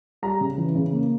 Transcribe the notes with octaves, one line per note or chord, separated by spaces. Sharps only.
G3 A#5
C#3
E3
C#3
A#3